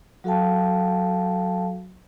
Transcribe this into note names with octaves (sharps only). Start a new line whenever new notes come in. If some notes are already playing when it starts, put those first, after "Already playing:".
F#3 F#4 A4 F5 G5 A5